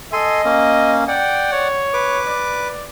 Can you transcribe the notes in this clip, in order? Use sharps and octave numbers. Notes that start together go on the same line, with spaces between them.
A4 D#5 G#5 C6
A#3 C#4
D5 F#5 G5
C#5
B4 D6
D5